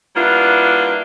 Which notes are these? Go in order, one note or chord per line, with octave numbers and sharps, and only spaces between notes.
G3 A#3 B3 D4 E4 F4